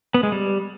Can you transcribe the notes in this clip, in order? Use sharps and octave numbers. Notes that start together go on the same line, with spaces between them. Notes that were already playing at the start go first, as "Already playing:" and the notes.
B3
G#3
G3